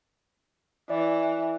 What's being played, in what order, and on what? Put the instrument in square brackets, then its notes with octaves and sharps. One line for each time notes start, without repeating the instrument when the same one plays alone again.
[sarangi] E3 [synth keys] D5